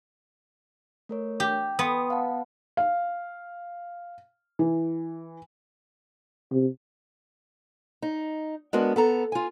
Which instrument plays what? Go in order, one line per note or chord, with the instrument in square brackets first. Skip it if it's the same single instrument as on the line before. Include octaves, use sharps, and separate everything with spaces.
[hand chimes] A3 A#4 C#5
[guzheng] G4
[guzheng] B3 [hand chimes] G5 C6 D#6
[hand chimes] F5 F#5 A5
[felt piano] F5
E3
[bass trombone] C3
[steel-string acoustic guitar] D#4
G#3 B3 D4 F#4 A#4
B3 A4 A#5
F4 G#5